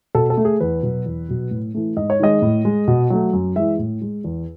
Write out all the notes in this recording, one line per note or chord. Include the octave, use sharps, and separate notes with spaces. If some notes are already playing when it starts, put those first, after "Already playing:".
B2 A4
A4
A3
G#4
E2 B4
B2 F#3
E2
B2 F#3
A2
E3 A3
G#2 D#5
C#5
D#3 G#3 D#5
A2
G#3
B2
F#3 A3
F#2
E3 G#3 E5
A2
G#3
E2